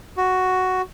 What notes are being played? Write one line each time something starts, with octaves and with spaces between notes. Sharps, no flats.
F#4